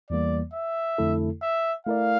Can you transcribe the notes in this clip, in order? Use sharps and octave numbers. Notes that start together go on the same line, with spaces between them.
E2 E3 G3 A#3 D5
E5
F2 D3 A3 E4 A4
E5
A3 E4 A#4 D5 F5